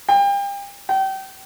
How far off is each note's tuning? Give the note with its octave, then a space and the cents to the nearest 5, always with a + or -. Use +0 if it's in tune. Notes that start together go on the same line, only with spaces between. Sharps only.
G5 +35
G5 -30